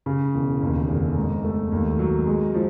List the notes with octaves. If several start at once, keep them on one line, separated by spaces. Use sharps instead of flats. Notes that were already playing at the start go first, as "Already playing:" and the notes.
C#3
E1
D#2
F1
G#2
A3
D#2
F#3
G#3
F3